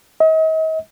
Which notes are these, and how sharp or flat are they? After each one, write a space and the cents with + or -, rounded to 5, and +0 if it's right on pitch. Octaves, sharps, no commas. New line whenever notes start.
D#5 +40